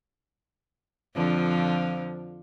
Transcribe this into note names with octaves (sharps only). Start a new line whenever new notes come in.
F2 D3 F3